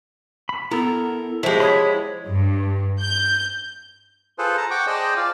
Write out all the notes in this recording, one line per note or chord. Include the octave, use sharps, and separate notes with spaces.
B5
B3 E4 A4 A#4
F3 G#3 E4 F#4 G4
C#5 B5 D#6
G2
G6
F4 G#4 A4 B4 C5
A5 A#5
F#5 G5 C#6 D6
G#4 C5 D5 D#5 G5 A5
F4 D5 F5